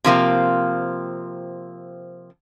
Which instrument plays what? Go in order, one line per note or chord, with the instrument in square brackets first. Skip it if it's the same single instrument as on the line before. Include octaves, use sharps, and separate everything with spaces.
[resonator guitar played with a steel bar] C3 F3 A#3 C4